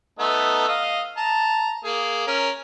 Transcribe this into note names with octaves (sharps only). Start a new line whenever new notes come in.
A3 B3 D#4
D#5 F5
A5 A#5
A#3 G#4
C#4 A#4